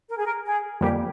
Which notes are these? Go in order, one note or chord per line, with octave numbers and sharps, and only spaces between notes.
A#4
G#4
A#4
G#4
F2 D3 G3 A#3 G4